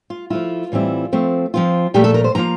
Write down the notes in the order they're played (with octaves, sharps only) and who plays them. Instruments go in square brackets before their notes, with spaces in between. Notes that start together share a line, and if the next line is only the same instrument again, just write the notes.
[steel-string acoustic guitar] F4
F3 A3 E4 F4
A2 E3 G3 C4 E4
F3 A3 C4
F3 C4 F4
A#2 F3 A3 G4
A4
A#4
C5
C3 F3 A#3 F4 A#5